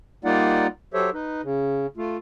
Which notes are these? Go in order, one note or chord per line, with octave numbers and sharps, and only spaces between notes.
G3 A#3 D#4 F4 D5 F#5
F#3 G4 A4 C5 C#5 E5
D#4 B4
C#3
A3 F4